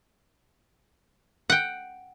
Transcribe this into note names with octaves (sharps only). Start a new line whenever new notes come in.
F#5 G5